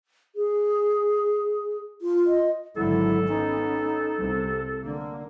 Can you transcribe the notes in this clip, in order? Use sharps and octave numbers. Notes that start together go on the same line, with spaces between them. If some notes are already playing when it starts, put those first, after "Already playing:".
G#4
F4
D#5
G#1 D3 F#3 E4 A4
B3 C#4 D#4
C2 C3
D3 A#3